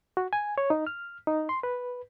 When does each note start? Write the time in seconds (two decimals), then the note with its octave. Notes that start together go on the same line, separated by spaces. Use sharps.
0.17 F#4
0.33 G#5
0.58 C#5
0.70 D#4
0.87 F6
1.27 D#4
1.49 C6
1.63 B4